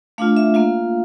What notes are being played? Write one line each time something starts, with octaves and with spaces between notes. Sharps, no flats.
A3 D4 F4 F5
E5
A#3 F4 F5